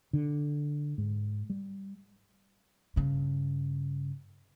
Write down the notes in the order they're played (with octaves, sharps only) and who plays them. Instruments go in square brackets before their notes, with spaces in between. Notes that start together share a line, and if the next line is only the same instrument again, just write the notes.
[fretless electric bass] D3
G#2
G3
[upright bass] G2 C#3